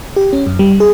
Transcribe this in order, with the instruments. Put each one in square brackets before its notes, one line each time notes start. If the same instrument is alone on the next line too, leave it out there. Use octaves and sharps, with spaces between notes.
[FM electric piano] G4
C#4
F#2
G3
G#4